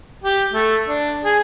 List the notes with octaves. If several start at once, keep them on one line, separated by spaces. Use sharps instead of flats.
G4
A3
D4
G#4